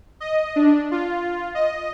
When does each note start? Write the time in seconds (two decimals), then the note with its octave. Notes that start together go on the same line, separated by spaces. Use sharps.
0.20 D#5
0.56 D4
0.91 F4
1.55 D#5